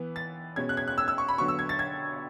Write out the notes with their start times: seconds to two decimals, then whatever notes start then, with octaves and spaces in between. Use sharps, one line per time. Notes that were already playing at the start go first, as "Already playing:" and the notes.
Already playing: E3 B3
0.16 A6
0.56 B2 G#3 C#4 G#6
0.69 F#6
0.77 G#6
0.88 F#6
0.98 E6
1.08 E6
1.18 C#6
1.29 B5
1.38 D3 F#3 B3 C#6
1.48 E6
1.59 G#6
1.69 A6
1.79 G#6